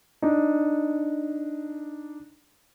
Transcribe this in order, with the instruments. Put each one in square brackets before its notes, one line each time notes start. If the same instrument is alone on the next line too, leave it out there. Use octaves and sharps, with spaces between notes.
[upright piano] D4 D#4